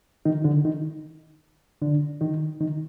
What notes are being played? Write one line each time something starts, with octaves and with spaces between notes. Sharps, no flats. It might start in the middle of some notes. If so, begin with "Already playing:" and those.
D#3 D#4
D3 D4
D#3 D#4
D3 D4
D#3 D#4
D#3 D#4